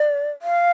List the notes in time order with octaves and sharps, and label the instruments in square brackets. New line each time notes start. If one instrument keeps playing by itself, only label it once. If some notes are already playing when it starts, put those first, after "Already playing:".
Already playing: [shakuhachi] D5
F5